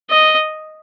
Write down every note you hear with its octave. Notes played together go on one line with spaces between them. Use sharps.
D#5